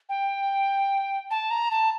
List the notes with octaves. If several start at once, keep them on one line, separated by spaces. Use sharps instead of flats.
G5
A5
A#5
A5